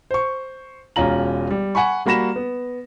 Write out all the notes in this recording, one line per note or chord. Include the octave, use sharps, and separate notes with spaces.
C5 C#6
E1 C#4 F4 A#5 F#7
G3
F#5 G#5 B5 C#6
G3 A#3 F#4 B5 A#6 E7
B3